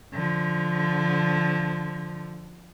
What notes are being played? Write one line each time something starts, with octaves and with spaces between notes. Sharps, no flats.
D3 F3